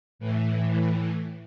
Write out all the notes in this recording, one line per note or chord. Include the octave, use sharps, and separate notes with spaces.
A2 E3